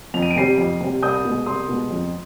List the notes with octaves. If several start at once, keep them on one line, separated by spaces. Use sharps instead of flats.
F2 F7
D#7
D7
C3 G3 C7 D#7
F2
C3 G3
C2 D#6 G6
B2 G#3
C2 C6 D#6
B2 G#3
F2